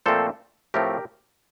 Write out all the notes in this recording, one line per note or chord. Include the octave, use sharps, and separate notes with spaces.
A#2 F3 A3 C4 A4 C5
A2 F3 A3 C4 G4 A#4